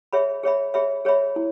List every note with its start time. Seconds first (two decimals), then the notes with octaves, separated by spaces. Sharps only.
0.13 G#4 C#5 E5 B5
0.43 G#4 C#5 E5 B5
0.74 G#4 C#5 E5 B5
1.05 G#4 C#5 E5 B5
1.36 E4